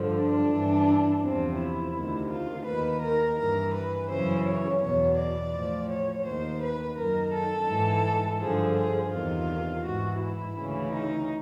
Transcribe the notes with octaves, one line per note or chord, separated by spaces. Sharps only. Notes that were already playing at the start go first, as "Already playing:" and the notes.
Already playing: G2 D3 F3
D4
G2 E3
E2 C3 F3 C4
E4
D2 C3 D#3
F4
D#2 D#3 B4
A#4
G2 E3 A#4
B4
F#2 C#3 E3 C5
C#5
E2 B2 C#5
D5
A2 F3
C#5
D#2 D#3 C5
B4
F#2 D#3 A#4
A4
G#2 E3
G2 D3 F3 G#4
G#4
E2 C3 D#3 F4
G#2 E3 F#4
E4
D2 C#3 E3
D#4